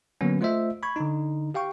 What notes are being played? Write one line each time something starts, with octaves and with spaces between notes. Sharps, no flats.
D3 F#3 A#3 B3 C#4
A3 F4 C5 D#5 E5
B5 C#6 G#6
D3 D#4
G4 F5 G5 C#6